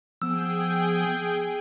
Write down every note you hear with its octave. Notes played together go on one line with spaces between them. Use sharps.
F3 B3 G#4 G5 E6